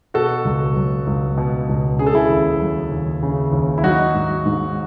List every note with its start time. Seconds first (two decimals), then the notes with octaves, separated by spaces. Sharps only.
0.14 B2 F#4 A4
0.45 C#2
0.76 F#3
1.07 C#2
1.38 B2
1.69 C#2
1.99 C#3 G#4
2.07 A4
2.15 E4 G#4
2.30 D#2
2.61 F#3
2.92 D#2
3.23 C#3
3.52 D#2
3.78 E4
3.83 F#3 D#4 F#4
4.14 G#2
4.46 G#2